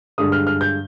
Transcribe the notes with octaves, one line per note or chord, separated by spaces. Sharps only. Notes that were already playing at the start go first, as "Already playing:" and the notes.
G2 D3 G#3 D#6
F6
F6
G6